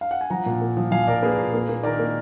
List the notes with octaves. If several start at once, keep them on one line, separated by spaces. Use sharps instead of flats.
F5
F#5
G#5
F3 F#5 A#5
A#2
A#3
F3
F3 F5 G#5
A#2 A#4 D5
A#3 G#4 B4
A#2
A#3
A#3
D#3 A#4 D5
A#3